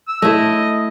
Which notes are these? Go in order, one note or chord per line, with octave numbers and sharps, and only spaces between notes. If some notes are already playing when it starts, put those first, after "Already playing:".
E6
A3 E4 D#5